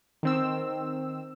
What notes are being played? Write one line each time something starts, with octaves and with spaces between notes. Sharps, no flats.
D#3 C4 E6